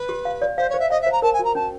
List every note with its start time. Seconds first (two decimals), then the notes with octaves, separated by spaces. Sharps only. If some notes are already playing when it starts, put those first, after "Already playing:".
Already playing: B4
0.09 G4
0.25 F5
0.42 D5
0.57 C5 F5
0.69 C#5
0.74 C5
0.79 E5
0.90 D#5 F5
1.01 E5
1.06 C5
1.12 A#5
1.22 A#4 A5
1.33 G#5
1.39 F#4
1.44 A#5
1.55 C#4 A5